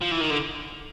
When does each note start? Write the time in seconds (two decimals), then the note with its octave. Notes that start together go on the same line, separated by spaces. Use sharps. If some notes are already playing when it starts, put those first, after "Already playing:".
0.02 F3
0.12 E3
0.21 D#3
0.31 D3